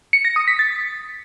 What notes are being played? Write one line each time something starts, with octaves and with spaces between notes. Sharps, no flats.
C#7
A#6
D#6
B6
A6